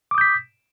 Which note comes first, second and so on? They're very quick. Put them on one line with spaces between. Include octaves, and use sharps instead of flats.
D6 D#6 G6 B6